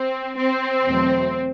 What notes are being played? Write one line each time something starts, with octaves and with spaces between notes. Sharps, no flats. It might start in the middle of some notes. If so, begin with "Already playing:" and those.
Already playing: C4
C4
E2 B2 F#3 A3